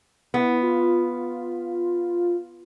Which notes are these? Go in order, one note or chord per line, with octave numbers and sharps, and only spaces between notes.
B3 E4
F4